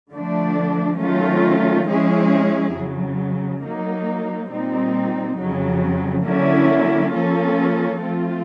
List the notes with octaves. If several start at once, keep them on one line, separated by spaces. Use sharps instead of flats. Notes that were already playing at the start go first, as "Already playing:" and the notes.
D3 F3 A3 D4
D#3 F#3 A3 C#4 F4
F3 G#3 C#4 E4 G#4
F2 C#3 F#3
F#3 A#3 D#4
A#2 G3 C4 D#4
F2 C#3 F#3
D3 F#3 A#3 C#4 E4
F3 A#3 C#4 F4 A4
F3 A3 C4 F4